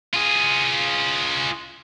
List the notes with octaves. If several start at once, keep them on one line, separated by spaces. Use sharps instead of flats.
F4 G#4